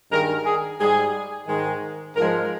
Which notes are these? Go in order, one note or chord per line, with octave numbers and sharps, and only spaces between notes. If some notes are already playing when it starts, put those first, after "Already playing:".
G2 D#3 G#3 A#4
G#4
G#2 G3 G#4
G#2 D#3 G#3
G#2 F3 G#3 A#4